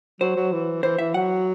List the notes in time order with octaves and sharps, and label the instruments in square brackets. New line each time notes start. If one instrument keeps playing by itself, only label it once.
[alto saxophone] F#3 [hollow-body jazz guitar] C5
[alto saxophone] F#3
E3
[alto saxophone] E3 [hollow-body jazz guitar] C5
[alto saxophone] E3 [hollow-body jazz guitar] E5
[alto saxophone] F#3 [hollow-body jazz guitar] F#5